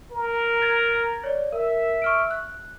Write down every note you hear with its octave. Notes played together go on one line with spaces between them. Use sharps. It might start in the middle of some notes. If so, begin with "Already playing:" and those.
A#4
G#6 A6
C#5 D5
A#4 E5
C#6 F6 D7
F#6